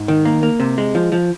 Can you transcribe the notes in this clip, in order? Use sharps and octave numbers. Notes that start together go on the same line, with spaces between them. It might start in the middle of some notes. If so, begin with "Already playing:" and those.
Already playing: G#2
D#3
A#3
A#3
C3
G#3
F3
F3